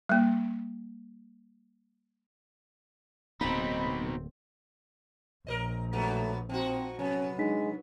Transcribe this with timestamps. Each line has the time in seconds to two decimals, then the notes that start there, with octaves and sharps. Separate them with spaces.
0.09 G3 A#3
3.41 D1 B2 A#3 C4 D#4 B5
5.47 A#1 A#4 C5 D#5
5.93 G2 F#3 A3 B3
6.49 F3 C4 D#4 F#4
6.99 C3 F#3 B3 C#4
7.38 G#3 D4 D#4 B6